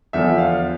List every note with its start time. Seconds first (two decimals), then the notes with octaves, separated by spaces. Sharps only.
0.13 E2 D3 F3 E5
0.38 F5